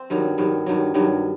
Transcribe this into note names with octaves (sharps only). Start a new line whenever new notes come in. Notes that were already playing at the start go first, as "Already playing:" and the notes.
Already playing: C4
G2 D#3 F#3
G2 D#3 F#3
G2 D#3 F#3
G2 D#3 F#3